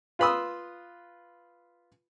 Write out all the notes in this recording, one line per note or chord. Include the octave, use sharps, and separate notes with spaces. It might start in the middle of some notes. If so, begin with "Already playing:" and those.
F4 B4 B5 C6 D#6 E6